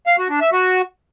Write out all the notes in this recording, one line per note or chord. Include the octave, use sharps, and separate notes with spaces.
F5
F#4
D4
E5
F#4